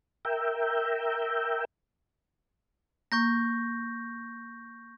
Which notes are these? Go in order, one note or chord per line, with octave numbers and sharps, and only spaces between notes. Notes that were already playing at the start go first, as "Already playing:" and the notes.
A#4 E5 G5
A#3 C#6 G6 A#6